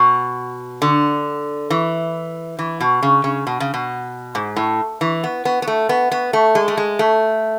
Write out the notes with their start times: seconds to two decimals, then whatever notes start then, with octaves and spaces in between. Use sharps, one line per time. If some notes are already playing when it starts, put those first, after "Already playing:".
Already playing: B2
0.82 D3
1.70 E3
2.59 E3
2.81 B2
3.03 C#3
3.24 C#3
3.47 B2
3.60 C#3
3.74 B2
4.35 G#2
4.56 A2
5.01 E3
5.24 B3
5.45 B3
5.62 B3
5.68 A3
5.89 B3
6.12 B3
6.33 A3
6.55 G#3
6.68 A3
6.77 G#3
6.99 A3